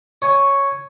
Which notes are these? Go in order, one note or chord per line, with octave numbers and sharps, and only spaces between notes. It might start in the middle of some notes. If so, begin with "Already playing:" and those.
C#5 G#5